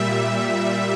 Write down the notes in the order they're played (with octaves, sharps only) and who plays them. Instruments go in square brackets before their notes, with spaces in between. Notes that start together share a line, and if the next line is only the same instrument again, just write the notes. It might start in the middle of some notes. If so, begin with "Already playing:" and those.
Already playing: [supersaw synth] A#2 G3 E5